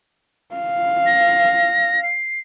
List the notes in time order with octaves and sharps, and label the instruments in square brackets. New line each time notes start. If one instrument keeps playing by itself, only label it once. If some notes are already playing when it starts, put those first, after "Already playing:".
[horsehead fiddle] F5
[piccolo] A#6
C7